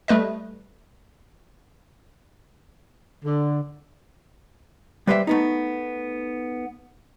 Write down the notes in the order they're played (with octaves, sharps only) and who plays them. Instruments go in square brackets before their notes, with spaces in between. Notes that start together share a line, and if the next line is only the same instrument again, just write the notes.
[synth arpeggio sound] G3 A3 B4 D#5
[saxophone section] D3
[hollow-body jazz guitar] G3 B4 C5 D5 E5
A3 B3 D#4